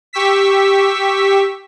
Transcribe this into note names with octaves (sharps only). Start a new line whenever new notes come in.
G4 C#6 E6 B6